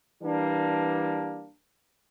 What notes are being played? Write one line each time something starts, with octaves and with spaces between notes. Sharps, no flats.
E3 G3 A#3 D4